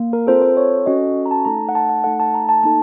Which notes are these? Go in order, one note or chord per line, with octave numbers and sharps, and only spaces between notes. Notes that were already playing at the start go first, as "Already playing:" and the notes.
Already playing: A#3
A#4
C4 F4 A4 C5
C5
C#5
C#4 F#4 A4 D#5
A#5
A5
A3 D#4 A4 A#5
F#5
A5
F#5
A3 D#4 A4 F#5
A5
A#5
A5
A#3 D#4 A4 A5